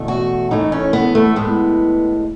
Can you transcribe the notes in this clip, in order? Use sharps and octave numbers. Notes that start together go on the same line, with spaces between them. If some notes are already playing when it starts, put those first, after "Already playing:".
Already playing: E2 B2 A3
F#4
A2 E3 A3 D#4
C#4
B3
A3
A2 G#3 B3